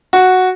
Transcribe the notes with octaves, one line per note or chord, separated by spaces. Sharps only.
F#4